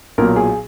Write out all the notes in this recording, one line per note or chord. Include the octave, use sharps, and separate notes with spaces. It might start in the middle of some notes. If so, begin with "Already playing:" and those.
B1 A#2 F#3 A#4
G#4